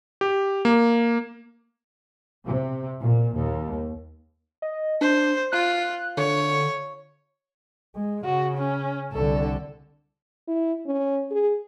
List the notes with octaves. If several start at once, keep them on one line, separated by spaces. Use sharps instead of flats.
G4
A#3
C3
A#2
D#2
D#5
D4 C5
F4 F#6
D3 C#5
G#3
C#3 F#4
C#4
C2 D3 A4
E4
C#4
G#4